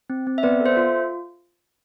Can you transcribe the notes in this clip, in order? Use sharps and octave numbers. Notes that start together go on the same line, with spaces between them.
C4
C4
E5
B3 B4 D5
A4
C5 E5
F4